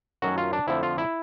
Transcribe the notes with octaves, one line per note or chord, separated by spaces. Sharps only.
F#2 D#3 F#3 A3 C#4 F#4
F4
D4
F2 D3 F3 A3 C4 E4
F4
E4